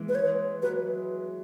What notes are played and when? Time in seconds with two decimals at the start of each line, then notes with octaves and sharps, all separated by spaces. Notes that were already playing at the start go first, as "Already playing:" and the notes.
Already playing: E3 G#3
0.09 B4
0.15 C#5
0.62 F#3 B4